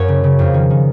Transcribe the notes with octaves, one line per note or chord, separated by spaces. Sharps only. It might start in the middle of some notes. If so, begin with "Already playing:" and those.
Already playing: F#2 F#4 A#4 C#5
C#3
C#3
F2
D#3
D#3